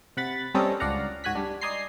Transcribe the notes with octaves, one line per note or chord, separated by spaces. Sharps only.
C3 F#5 B5 A6
G3 C4 C#4 A4 A#4 D#5
C#2 D4 D5 F5 F#5 A#5
G#2 F#4 G#5 F#6 B6
G3 D4
D5 D#5 G#5 A#5 C6 C7